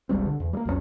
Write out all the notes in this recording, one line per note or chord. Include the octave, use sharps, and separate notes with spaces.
E1 B1 G3 C4
D3
E2
G3 A#3
B1 F2 D#3 C#4